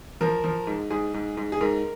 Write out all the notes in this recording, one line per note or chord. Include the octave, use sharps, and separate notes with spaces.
F3 A#4
F3
G#2
G#2 G#4
G#2
G#2
G#4
G#2 A#4